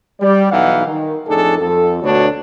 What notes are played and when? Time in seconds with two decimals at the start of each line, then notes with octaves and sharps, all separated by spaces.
0.20 G3 D5
0.52 B1 E3 D#4 F5 F#5
0.86 D#3
1.27 F2 A2 D4 D#4 G#4 A4
1.58 F2 A4
2.02 D2 B2 B3 D4 F#4 C#5